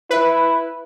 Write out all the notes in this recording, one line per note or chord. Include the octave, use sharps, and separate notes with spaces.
E4 B4